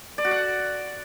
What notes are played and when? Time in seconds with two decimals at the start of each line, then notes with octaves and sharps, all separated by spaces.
0.18 D5
0.25 F#4
0.31 F#5